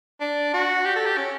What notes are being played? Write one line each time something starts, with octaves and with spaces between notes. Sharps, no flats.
D4
F#4
G4
A4
G4
C#4